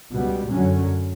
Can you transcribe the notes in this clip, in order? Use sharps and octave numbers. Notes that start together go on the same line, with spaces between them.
C#2 B2 G3 B3
F#2 D3 F#3 C#4